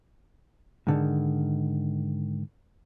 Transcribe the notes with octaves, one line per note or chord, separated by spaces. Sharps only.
G#2 D3 D#3